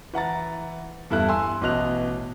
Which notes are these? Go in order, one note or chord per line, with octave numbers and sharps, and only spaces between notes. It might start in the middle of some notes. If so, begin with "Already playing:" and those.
E3 F#5 A#5 A6
E2 G2 E4 A4 F#6
G#5 C6 E6
A1 B2 D#5 F#6 F7